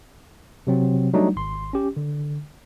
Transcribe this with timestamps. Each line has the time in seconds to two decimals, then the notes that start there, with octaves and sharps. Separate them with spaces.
0.67 C3 F#3 C4
1.13 F#3 G3 A3 D4 D#4
1.36 G#1 C6
1.73 C#4 G4
1.97 D3